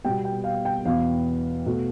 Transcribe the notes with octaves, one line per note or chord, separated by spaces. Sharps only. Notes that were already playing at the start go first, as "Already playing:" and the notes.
B2 G3 B3 G5
G5
F5
G5
E2 B2 B3 F5
B2 A3